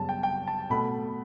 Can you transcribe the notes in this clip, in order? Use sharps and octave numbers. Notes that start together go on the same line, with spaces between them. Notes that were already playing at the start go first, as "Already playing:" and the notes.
Already playing: F#2 C#3 G3 B3 A5
G5
G5
A5
B2 A3 B5